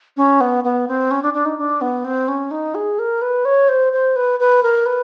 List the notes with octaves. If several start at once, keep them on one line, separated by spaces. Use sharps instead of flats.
C#4
B3
B3
C4
C#4
D4
D4
D#4
D4
B3
C4
C#4
D#4
G#4
A#4
B4
C#5
C5
C5
B4
B4
A#4
B4